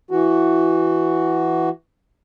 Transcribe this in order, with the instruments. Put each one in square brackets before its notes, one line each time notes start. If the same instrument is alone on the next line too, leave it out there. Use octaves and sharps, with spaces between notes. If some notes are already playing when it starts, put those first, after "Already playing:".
[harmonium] E3 F#4